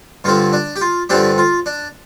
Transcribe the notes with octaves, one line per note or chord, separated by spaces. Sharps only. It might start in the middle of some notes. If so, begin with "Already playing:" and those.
G2 D3 F3 C4 F4
D4
G4
F4
G2 D3 F3 C4 D4 G4
F4
D4